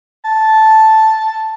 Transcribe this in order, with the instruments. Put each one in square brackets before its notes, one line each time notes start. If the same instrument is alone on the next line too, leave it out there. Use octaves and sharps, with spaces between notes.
[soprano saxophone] A5